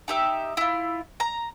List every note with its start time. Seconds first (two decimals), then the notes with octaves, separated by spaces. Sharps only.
0.08 D#4 G4 E5
0.57 E4 F4
1.20 A#5